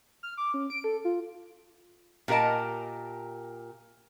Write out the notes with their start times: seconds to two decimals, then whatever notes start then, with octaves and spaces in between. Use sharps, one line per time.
0.23 F6
0.38 D6
0.54 C#4
0.70 D7
0.84 A4
1.05 F4
2.28 A#2 G4 A#4 D#5 A5